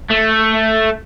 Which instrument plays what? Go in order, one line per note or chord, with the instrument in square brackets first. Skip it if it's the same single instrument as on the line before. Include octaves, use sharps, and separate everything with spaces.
[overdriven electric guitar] A3